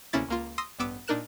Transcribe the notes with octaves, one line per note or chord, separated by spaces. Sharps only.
D2 C3 A#3 C#4 E4 A6
C#2 A#3 F4
C6 D#6 E6 A#6
A1 G2 B3 D6 E6 D7
A#2 D4 D#4 A#4 F#6 E7